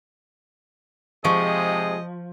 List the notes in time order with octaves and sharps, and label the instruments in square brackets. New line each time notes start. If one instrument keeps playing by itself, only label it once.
[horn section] C3 G#3 G#4 [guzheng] F3 [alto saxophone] D#5 [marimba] C#6